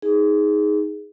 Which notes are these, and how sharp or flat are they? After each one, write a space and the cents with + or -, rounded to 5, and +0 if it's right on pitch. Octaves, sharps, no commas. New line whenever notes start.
D#4 +15 G#4 +0